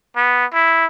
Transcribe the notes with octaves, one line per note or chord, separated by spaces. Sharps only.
B3
E4